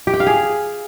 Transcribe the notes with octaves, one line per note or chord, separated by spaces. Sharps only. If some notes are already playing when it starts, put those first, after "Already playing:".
G4
G5
F5
G#4